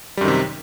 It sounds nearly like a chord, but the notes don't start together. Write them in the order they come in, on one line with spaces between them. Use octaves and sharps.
G3 F#2 D#3 C3